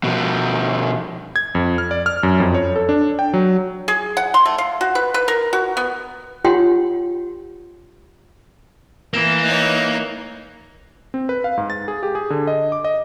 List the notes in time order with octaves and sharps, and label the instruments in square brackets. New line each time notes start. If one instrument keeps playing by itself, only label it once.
[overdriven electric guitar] B2 F3
[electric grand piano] G#6
F2
F6
D5
F6
F#2
F2
C#5
A4
D4
G5
F#3
[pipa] G#4
F#5
C6
A3
F5
F#4
B4
B4
A#4
F#4
B3
[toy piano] F4 G4 C#5 F#5 G5 C6
[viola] E3 [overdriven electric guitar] A#3 [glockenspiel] E7 G7
[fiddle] D#4 C#5 [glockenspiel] F#6 F7
[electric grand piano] C4
B4
F5
G#2
A6
G#4
G4
G#4
D3
D#5
D6
D#5